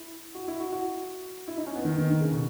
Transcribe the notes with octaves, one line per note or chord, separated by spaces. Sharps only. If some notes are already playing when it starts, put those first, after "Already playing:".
Already playing: E4
F#4
E4
F#4
F#4
E4
D#4
C#4
B3
D#3
D#3
D#3
C#3
B2